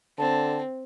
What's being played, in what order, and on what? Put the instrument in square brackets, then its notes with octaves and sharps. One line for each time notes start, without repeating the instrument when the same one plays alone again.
[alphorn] D3 [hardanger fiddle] C4 [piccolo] A5